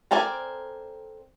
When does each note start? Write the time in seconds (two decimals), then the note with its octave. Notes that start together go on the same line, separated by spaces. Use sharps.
0.11 C4 A4 A#4 D5 G#5